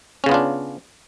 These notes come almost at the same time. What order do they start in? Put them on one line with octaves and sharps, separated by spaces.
C#4 C#3 B3 F4 D4